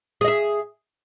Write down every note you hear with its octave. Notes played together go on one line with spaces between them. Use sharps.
G#4 D#5 E5